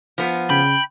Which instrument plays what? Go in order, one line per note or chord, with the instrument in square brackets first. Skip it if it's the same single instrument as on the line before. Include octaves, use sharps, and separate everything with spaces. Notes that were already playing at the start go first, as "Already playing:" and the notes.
[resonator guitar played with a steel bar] F3 B3
[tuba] C#3 [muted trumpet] G5 [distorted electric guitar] B5